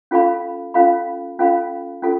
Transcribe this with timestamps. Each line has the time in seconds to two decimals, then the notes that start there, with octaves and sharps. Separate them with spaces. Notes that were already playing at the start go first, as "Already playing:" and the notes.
0.11 C#4 F4 A4 F5 B5
0.74 C#4 F4 A4 F5 B5
1.39 C#4 F4 A4 F5 B5
2.02 C#4 F4 A4